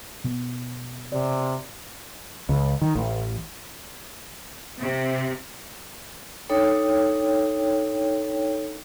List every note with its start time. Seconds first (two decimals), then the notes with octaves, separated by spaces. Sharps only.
0.24 B2 B3
1.12 C3 D5
2.49 C#2
2.81 D#3
2.95 A1
4.79 C3
6.49 D4 D#4 A4 C#5 G5